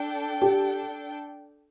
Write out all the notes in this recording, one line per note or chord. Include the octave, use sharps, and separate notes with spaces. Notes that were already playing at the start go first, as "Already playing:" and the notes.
Already playing: D4 A4 G5
G4